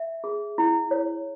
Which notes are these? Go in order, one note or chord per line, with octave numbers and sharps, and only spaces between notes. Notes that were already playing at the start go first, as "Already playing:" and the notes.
Already playing: E5
G#4
E4
C#5